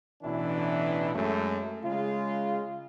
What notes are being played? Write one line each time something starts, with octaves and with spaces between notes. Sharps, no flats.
A1 B2 E3 D4 E4
F#2 G#3 A3
C#3 G#3 F4